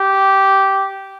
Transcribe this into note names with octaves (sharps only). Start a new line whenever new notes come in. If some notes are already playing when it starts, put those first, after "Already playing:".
Already playing: G4